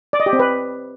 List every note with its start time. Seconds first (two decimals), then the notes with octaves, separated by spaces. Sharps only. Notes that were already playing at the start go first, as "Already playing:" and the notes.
0.13 D5
0.20 D#5
0.26 G4
0.33 C4
0.39 B4